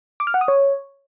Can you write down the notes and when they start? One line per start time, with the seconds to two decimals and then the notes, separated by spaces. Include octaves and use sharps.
0.20 D6
0.27 F6
0.34 F#5
0.41 D#6
0.48 C#5